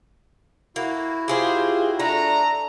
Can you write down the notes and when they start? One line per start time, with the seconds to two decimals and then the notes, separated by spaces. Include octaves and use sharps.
0.76 A#3 E4 F#4
1.28 F4 G4 G#4 C5
2.00 A3 D4 A#5